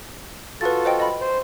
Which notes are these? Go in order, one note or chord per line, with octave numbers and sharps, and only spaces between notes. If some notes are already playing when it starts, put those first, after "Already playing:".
F4 F#4 A4 B4 A6
C5 D#5 G5
D#5 B5
C5